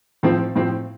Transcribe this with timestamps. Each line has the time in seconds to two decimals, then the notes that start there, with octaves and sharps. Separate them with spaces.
0.23 A2 F3 C4
0.56 A2 F3 C4